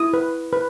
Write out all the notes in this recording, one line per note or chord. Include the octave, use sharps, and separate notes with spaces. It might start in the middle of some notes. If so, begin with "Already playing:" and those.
Already playing: E4 D#6
B4
B4